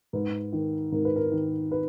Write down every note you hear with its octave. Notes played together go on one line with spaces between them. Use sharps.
G#2 B4
D#3
G#2 A#4
B4
A#4
D#3
B4